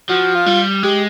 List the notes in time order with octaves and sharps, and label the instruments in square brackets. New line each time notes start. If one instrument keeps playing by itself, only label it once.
[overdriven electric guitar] F3 [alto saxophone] F#4
[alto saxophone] F4
[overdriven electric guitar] G3
[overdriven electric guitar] G#3 [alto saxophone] G4